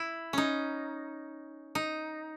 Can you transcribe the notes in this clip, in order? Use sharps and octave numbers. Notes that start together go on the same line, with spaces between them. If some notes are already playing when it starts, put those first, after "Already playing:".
Already playing: E4
C#4 D#4
D#4